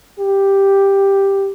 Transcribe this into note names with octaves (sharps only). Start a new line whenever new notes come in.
G4